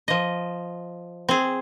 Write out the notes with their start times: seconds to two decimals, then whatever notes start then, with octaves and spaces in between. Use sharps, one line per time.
0.08 F3 D#5
1.29 C4 G#4